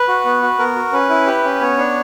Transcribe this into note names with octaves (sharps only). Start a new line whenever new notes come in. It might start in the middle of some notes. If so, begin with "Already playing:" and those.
Already playing: B4
F#4
B3
F#4
B3 A#4
F#4
C#4 B4
E4
G4
C#4
B3 C#5
D4